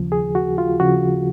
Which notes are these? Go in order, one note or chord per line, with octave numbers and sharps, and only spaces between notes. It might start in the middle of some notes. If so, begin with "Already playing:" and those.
Already playing: D#2 C#3 F3
G#4
F#4
F4
C#3 F3 F#4